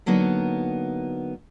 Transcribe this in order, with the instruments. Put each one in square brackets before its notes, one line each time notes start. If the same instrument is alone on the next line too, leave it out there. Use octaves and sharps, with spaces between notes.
[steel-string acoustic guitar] D3 F#3 A#3 B3 D#4